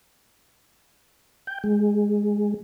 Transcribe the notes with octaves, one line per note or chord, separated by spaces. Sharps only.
G5
G#3